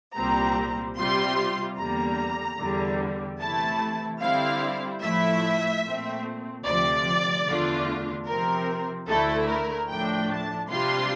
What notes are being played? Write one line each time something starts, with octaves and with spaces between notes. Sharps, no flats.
C2 A#2 G3 C4 A#5
C3 G3 C4 F4 C6
E2 D3 G3 A#3 A#5
E2 D3 G3
C3 E3 A3 E4 A5
D3 G3 C4 E4 F5
A2 F3 A3 E4 E5
A#2 A3 C4
D2 C3 F3 D5
E2 D3 A3 D4 F4
C3 F3 C4 A#4
D2 D3 A3 E4 A4
A#4
A2 F3 A3 D4 G5
A5
C3 G3 D4 F4 C6